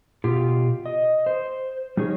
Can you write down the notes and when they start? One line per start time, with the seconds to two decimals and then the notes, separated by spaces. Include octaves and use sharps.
0.24 B2 F4 G4
0.86 D#5
1.26 C5
1.97 G3 D#4 G#4 C#5